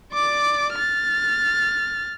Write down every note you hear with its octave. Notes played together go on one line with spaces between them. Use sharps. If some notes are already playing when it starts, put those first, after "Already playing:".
D5 D6
F6 A6